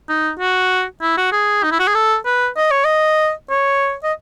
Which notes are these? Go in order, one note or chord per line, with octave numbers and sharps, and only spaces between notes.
D#4
F#4
E4
F#4
G#4
D#4
E4
F#4
G#4
A4
B4
D#5
C#5
D#5
C#5
D#5